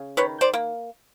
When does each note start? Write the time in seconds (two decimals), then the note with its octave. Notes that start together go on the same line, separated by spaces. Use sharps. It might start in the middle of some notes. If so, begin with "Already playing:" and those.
Already playing: C#3
0.17 D#3 B4 C#5
0.41 C5 D5
0.54 A#3